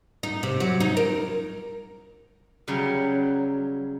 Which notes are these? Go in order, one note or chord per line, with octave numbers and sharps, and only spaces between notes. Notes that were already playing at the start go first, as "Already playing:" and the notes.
D#4
C3
F#3
D#4
A#4
C#3 F#3 G3